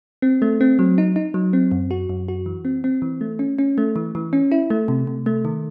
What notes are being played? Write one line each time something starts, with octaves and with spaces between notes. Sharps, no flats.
C4
A3
C4
F#3
D#4
D#4
F#3
C4
F#2
F#4
F#2
F#4
E3
C4
C4
E3
A3
C#4
C#4
A3
E3
E3
C#4
E4
A3
C3
C3
A3
D#3